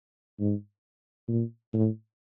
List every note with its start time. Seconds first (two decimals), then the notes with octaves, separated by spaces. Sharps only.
0.40 G#2
1.28 A#2
1.74 A2